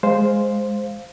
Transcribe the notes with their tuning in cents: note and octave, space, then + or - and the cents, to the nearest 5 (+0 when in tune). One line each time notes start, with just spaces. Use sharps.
G#3 +0 C5 +0 F5 +0